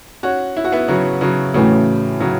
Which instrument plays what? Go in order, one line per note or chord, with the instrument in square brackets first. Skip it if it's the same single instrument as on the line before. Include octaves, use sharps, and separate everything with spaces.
[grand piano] C#4 F#4
E4
F#4
B3 E4
C#3 F#3
C#3 F#3
[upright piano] A2 E3 A3 C#4 F#4 [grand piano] C#3
[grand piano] C#3 F#3